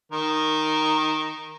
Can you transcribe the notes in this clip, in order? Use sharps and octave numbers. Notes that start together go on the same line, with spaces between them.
D#3 A#4